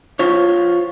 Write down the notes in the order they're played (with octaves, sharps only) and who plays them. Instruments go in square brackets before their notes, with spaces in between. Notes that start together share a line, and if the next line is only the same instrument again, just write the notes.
[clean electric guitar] F4 C5 C#5